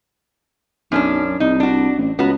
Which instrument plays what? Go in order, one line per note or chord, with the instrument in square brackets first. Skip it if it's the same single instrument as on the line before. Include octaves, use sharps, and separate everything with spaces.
[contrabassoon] B1 [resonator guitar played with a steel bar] F#2 C#4 D4
[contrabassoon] C2 [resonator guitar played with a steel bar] D#4
[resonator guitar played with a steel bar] D4 F#4
[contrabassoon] A1
[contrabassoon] C#2 [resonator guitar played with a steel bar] B3 F#4